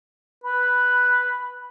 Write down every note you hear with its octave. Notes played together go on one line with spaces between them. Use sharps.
B4 B5